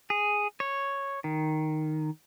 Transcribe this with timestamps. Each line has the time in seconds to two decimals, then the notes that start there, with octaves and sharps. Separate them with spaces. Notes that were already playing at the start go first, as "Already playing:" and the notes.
0.10 G#4
0.60 C#5
1.24 D#3